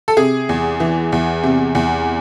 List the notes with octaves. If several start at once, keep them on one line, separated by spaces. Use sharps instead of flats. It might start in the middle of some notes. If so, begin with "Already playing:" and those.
A4
C3 G#4
E2
E3
E2
C3
E2